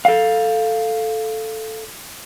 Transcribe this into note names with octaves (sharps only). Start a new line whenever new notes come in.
A4 F5